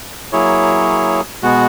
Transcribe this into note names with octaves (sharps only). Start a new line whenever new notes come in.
F#3 A#3 E4 G#4 C#5
B2 G#3 B3 F#4